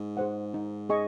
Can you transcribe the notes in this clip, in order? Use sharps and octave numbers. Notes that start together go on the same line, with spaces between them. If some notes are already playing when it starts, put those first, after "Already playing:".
Already playing: G#2
G#4 C5 F#5
D#4
G#4 D#5 G#5 C#6